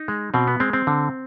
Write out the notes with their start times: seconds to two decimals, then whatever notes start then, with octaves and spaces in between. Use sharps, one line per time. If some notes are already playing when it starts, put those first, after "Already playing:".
Already playing: D#4
0.08 G#3
0.34 B2 C4
0.48 B3
0.60 G#3 C4
0.73 C4
0.87 D3